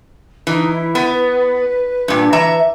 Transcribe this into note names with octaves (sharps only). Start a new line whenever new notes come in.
E3 D#4
E4
B3
B4
G2 A#2
E3 E5 A#5